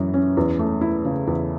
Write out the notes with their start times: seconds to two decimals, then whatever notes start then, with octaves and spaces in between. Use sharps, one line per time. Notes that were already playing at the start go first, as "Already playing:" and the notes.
Already playing: F#2 E3 E4
0.14 C#4
0.37 E2
0.59 A3
0.81 E4
1.05 C#3
1.27 E2